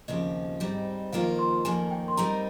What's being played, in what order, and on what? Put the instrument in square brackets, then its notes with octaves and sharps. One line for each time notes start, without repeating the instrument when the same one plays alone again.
[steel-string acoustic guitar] D#2 C#3 F3 C4 G4 [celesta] D#5
[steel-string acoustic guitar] G#2 G3 C4 D#4
[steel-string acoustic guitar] F2 D#3 A#3 F4 C5 [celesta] F5
[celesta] C6
[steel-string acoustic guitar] F2 D#3 A#3 [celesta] G#5
[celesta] G5
C6
[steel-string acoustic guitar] G3 C4 D#4 A#4 [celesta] A#5